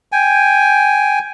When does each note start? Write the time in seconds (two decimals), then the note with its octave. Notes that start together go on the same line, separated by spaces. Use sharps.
0.12 G5 G#5